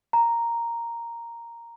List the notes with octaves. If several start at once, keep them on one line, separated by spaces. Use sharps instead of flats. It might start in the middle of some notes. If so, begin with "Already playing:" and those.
A#5